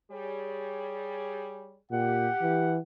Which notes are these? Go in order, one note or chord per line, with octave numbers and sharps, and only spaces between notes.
G3 G#4 C#5
A#2 G4 F#5
E3